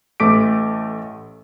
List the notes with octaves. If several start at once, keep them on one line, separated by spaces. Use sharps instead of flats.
A1 A3 D6 B6 D7